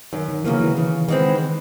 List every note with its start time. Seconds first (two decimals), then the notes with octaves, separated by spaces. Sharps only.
0.13 F#2 D#3
0.29 D#3
0.44 C#3 E3 F#3 A#3
0.61 E3
0.77 C#3
1.08 D#3 E3 G#3 C4